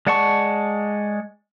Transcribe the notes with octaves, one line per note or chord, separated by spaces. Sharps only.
G#3 D5 F#5 A5 C#6